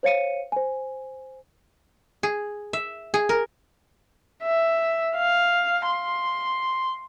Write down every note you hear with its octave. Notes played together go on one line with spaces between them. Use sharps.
C5 C#5 F5 C#7 D#7
C5 G#5
G#4
E5
G#4
A#4
E5
F5
C6